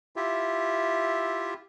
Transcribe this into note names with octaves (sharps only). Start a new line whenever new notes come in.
E4 F4 G4 E5